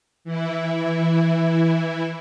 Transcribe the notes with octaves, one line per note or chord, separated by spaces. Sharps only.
E3 E4